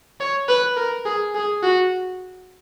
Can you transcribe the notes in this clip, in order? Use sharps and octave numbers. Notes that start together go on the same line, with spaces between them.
C#5
B4
A#4
G#4
G#4
F#4